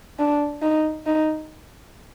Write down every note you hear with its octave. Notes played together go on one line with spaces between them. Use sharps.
D4
D#4
D#4